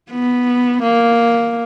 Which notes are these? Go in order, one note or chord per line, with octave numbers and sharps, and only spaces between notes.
B3
A#3